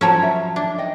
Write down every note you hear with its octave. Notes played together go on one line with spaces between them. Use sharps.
F3 F#3 C#4 A4 A5 A#5
E5
D4
D#4 D#5 G5